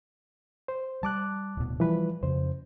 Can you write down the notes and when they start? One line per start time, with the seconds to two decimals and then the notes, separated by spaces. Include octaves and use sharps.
0.68 C5
1.03 G3 A5 D6 F#6
1.57 D1 B2
1.80 E3 F3 G3 B4
2.23 F2 C#3 C5